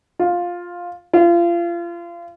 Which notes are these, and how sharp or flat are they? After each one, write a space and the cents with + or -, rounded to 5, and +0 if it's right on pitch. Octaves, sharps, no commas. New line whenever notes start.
F4 +10
F4 -30